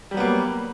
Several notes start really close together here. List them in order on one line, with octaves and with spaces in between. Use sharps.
G3 F#3 B3 A#3